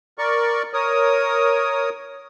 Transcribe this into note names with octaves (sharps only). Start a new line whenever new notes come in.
A#4 D5 C#6
A#4 C#5 D#6